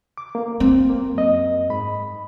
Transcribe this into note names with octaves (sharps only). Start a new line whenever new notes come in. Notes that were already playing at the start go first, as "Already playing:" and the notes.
D6
A#3
C4
A#3
F#2 D#5
G#2 B5